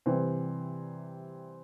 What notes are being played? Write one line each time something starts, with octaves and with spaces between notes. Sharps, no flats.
C3 E3 G3 C4